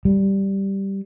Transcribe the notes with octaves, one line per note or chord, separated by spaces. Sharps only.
G3